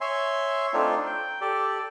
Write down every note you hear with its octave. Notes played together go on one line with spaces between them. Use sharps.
C#5 E5 G#5 C6
A3 C4 D4 D#4 F4
G5
G4 A4 D5